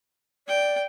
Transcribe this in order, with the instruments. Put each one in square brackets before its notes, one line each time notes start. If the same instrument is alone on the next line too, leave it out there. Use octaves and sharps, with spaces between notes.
[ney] D5 [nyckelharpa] G5